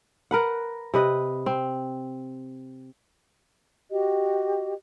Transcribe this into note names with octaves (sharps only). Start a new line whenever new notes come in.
A#4 B4 F#5
C3 B4 D#5
C4
F#4 G4 D#5